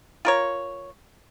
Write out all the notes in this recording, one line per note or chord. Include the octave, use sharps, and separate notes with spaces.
F4 A#4 C#5